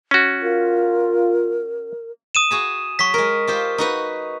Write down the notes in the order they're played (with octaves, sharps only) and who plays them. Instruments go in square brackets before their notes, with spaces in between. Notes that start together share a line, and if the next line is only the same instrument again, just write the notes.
[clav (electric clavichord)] C#4 F#4
[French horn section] F4 [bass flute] A#4
[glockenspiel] D#6 D#7 E7
[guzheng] F#4 G#4 B5
[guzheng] F#3 [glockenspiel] C#6 B6
[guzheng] G#3 A#4
F4 G4 C5
D#4 F#4 B4